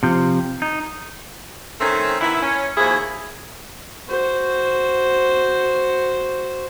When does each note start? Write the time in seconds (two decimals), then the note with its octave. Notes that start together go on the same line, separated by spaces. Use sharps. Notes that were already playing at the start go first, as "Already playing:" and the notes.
0.03 C3 F3
0.62 D#4
1.80 D#3 A3 C4 C#4
2.21 D#3 B3 E4
2.42 C#4
2.77 D#2 F3 E4 F#4 G#4
4.09 F#4 C5